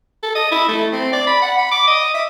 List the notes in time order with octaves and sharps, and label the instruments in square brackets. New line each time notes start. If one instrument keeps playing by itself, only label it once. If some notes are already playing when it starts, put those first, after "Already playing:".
[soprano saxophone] A4
D#5
E4
A3
C4
D5
B5
F#5
B5
D6
D#5
E5